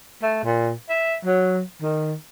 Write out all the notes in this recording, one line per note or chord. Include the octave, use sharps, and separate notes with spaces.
A3
A#2
E5
F#3
D#3